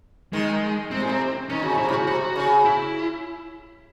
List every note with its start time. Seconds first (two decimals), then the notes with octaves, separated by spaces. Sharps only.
0.33 D#3 G#3
0.91 C3 C4
1.00 A2
1.09 C3
1.49 D#3 C#4
1.62 C#3 F#4
1.75 C3 E4
1.89 C#3
1.93 F#4
2.07 C3 F#4
2.36 C#3
2.65 E4